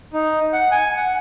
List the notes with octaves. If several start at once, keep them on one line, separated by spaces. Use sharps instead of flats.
D#4
F#5
G#5
F#5